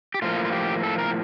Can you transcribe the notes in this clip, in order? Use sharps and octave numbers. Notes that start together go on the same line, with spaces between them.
G4
A2 F3 A#3 F4
F4
G4
A4
A#4